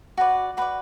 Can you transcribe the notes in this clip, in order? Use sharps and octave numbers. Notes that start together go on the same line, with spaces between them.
F#4 B4 D5
F#4 B4 D5 B5